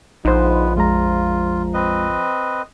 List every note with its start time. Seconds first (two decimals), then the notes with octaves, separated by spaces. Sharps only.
0.25 A#1 F3 G#3 B3 D#4 B4 C5
0.76 F2 G#3 F4 A#5
1.74 C4 B4 D#5